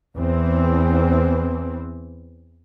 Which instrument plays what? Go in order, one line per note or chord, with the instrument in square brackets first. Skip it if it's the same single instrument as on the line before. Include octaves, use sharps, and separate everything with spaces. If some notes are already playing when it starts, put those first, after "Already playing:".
[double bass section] E2 E3 C4